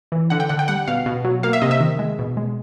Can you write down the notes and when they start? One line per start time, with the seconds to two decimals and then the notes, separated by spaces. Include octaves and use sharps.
0.12 E3
0.30 D3 F#5
0.40 G5
0.49 D3 F#5
0.59 G5
0.68 G3 F#5
0.88 B2 F5
1.06 B2
1.25 F#3
1.43 A#3 F5
1.53 E5
1.62 C3 D#5
1.71 E5
1.80 D#3
1.99 G#3
2.19 B2
2.37 G#3